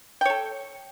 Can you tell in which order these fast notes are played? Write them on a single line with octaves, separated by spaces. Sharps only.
G5 C#5 A4